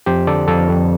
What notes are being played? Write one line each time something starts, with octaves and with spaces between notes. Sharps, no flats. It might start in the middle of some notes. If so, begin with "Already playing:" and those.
F2 G4 C5
D3 A4 D5
F2 F4 A4
F2